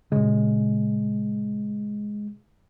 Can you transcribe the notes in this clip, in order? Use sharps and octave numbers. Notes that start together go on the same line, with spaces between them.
A#2 C#3 G#3